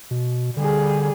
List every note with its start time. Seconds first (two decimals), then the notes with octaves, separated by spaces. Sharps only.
0.11 B2
0.57 D3 G3 G#4